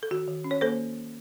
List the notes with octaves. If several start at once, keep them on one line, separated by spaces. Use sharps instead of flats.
A4
D#3 F#4
D#3
C#4
C#5
A#3 A4 C5